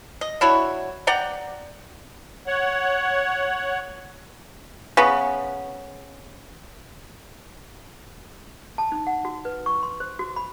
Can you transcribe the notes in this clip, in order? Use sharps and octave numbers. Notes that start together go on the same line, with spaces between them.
D#5
D4 E4 F#4 C#5
D5 F#5 G5 A#5
C#5 F#5
C#3 B3
A5
D#4
F#5
F#4
B4
C#6
C6
C5
F#4
B5